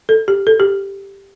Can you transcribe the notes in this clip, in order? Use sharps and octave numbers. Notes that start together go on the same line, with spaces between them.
A4
G4
A4
G4